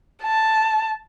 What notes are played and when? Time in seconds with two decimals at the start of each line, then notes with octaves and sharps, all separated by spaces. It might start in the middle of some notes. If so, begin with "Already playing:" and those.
0.23 A5